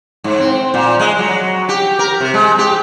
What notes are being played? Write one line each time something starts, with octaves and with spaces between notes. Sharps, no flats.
G#2
C4
A#2
G#3
F#3
G4
A#4
C3
G#3
G4